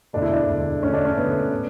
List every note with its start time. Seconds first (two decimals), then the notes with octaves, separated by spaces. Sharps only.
0.13 E1 D2 D3 D4
0.22 E4
0.32 D4
0.48 E1 D2 D3
0.83 E1 D2 D3 C#4
0.93 D4
1.05 C#4
1.17 E1 D2 D3 B3
1.53 A2